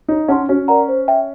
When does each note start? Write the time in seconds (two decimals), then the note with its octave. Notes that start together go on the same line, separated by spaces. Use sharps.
0.08 D#4 C#5
0.28 C#4 F#5 A5 C6
0.49 C#4 F#4
0.68 A#4 D5 F#5 A#5
0.89 C5
1.08 E5 G5